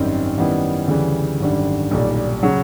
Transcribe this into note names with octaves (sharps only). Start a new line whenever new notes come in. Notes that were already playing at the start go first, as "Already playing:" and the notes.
Already playing: G#1 F#2 D#3 G3 C4
F#2 D#3 G3 B3 E4
D2 C#3 E3 G3
G#1 F#2 D3 G3
B1 A#2 G3
C#3 F#3